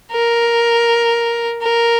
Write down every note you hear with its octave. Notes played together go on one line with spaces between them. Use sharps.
A#4
A#4